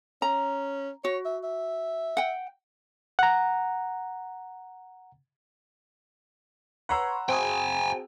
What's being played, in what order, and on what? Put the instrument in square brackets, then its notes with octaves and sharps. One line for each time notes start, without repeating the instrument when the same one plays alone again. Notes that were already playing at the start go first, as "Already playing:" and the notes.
[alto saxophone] C#4 [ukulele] A#5
[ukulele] F#4 [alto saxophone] C#5
[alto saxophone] E5
E5
[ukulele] F#5 G5
[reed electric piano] F#5 A#5
[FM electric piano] B4 C#5 C6 [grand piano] F#5 A#5 E6
[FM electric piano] C4 F#4 G#4 [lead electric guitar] G5 G#5